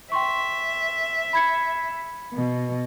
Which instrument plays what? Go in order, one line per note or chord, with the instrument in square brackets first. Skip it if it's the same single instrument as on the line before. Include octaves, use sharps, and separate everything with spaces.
[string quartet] E5 [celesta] G5 C6 C#6
[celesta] B5 G#6 C#7
[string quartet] B2